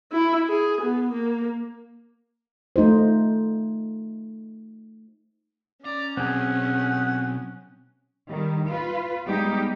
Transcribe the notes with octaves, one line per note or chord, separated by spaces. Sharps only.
E4
G#4
B3
A#3
A3 D#4 F4 C5
C#4 D5 A#5
B1 C4 G#4 F#5
D#3 G3
F4 B4
G3 G#3 B3 D#4 G4